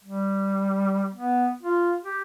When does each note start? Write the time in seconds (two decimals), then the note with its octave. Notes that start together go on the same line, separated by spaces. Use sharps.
0.04 G3
1.15 B3
1.63 F4
2.04 G4